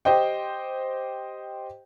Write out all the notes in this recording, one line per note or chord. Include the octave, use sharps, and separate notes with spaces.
G4 C5 D#5 G5